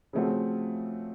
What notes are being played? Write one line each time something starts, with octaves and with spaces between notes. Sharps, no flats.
C#3 F3 A3 C4 F#4